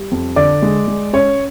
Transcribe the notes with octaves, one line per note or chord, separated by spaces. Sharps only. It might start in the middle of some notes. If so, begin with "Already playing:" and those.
Already playing: G3
F2
D3 D5
G#3
G#3
C#4 C#5